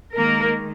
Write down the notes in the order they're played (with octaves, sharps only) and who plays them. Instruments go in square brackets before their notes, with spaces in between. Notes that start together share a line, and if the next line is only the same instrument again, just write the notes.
[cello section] D#3 G#3 A#3 A#4